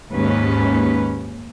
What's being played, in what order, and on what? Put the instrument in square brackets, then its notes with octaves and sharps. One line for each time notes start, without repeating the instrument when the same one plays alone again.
[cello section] D#2 G#2 C#4 B4